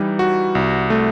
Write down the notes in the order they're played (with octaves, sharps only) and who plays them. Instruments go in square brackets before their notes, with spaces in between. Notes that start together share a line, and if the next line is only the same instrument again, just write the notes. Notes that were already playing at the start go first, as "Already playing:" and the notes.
Already playing: [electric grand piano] E3 G3 D#4
F#4
C2
A3